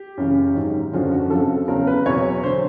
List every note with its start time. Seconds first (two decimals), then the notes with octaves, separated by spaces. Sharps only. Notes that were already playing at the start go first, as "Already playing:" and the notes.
Already playing: G4
0.17 F#2 C#3 E3
0.55 G#2 D#3 F#3
0.93 F#2 D3 F3 F#4
1.12 F#4
1.30 F2 C#3 F3 A4
1.68 E2 C#3 F#3 A#4
1.87 B4
2.06 E2 B2 F#3 C#5
2.44 D3 F#3 C5